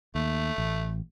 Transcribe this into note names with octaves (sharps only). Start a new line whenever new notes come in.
D#2 A3
A1